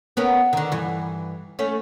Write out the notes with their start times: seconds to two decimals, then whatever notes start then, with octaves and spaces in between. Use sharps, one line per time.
0.17 B3 C#4 A#4
0.53 D3 D#3
0.72 G2 E3
1.59 A3 C#4